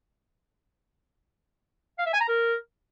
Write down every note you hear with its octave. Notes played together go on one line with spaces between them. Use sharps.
F5
E5
G#5
A#5
A#4